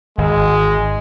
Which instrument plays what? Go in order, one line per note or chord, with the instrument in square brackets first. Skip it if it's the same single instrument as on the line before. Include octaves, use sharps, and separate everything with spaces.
[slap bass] G#1 [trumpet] G#3